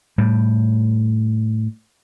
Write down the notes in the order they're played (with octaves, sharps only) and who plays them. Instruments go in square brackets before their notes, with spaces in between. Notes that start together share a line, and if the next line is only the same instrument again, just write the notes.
[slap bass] A2 G3